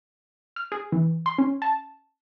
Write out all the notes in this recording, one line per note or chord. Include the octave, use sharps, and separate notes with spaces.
F6
G#4
E3
C6
C#4
A5